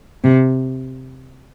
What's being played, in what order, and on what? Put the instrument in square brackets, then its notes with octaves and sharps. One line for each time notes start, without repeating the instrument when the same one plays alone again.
[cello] C3